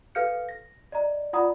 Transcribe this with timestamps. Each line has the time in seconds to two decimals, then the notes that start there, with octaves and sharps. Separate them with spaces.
0.15 A4 B4 F5 F6 G6 C#7
0.49 A#6
0.92 D5 D#5 A#5
1.33 F4 D5 F#5 A#5 B5 D#6